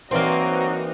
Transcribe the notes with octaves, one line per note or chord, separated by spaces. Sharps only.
G2 E3 F#3 A#3 C4 D#4 F#4 D5